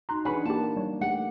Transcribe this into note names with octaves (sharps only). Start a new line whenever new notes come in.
D#4 F#4 A#5 C6 F#6
E3 C#4 D4 G#4 B4 F#5 B5 C#6
A#3 F4 G4 A5
G3 C#5
A3 G4 F#5